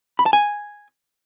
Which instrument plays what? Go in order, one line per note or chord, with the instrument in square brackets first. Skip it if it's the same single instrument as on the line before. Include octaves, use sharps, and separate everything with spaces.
[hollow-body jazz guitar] B5
A5
G#5